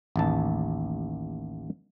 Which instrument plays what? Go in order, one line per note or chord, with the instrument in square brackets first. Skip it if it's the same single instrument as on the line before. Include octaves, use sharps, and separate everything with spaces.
[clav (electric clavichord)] A1 D#2 A5